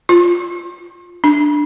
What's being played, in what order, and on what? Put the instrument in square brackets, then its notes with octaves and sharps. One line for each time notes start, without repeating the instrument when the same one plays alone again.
[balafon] F4
D4